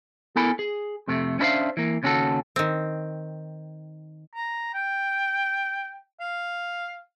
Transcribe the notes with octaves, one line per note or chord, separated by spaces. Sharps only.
B3 E4 A4 A#4 G#5 B5
G#4
F2 C3 A3
C#4 D4 E4 C5 E5 F5
E3 A#3
D#2 C#3 C#4 F4 F#4 A4
D#3 C4
A#5
G5
F5